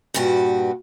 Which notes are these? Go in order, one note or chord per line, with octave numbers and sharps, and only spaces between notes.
G2 A#2 F#4 G4 B4